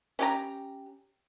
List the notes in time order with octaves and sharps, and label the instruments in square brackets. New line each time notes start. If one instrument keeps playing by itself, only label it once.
[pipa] C#4 G4 A#5